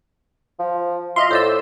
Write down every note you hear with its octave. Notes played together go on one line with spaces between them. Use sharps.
F3
F4 D#5 E5 C6
A2 C5 D5 E6